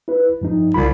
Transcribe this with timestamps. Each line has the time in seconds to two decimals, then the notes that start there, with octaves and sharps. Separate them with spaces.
0.08 E4 B4
0.41 G2 F3 D#4
0.74 C2 C#3 F4 B5